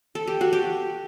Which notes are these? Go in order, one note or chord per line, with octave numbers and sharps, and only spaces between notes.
A4
G4
F#4
G4